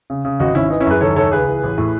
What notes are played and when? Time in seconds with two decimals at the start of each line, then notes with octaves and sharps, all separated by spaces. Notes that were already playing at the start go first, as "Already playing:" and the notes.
0.10 C#3
0.25 C#3
0.39 G#1 D#4 F#4
0.55 G#1 C#4 E4
0.70 E3 D#4
0.80 C#4 E4
0.86 F#2 G#4 B4
1.01 D#2 A4 C#5
1.16 D#2 A4 C#5
1.32 C#2 G#4 B4
1.47 E3
1.63 A1
1.78 A2